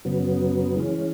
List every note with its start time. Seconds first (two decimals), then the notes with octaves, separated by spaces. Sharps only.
0.05 F#2 C#3 F#3 B3
0.76 E3 G#3 C#4